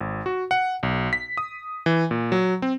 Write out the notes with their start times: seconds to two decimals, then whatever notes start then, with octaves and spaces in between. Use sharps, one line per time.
0.01 G#1
0.26 F#4
0.51 F#5
0.83 B1
1.13 B6
1.37 D#6
1.86 E3
2.11 A#2
2.32 F#3
2.62 C4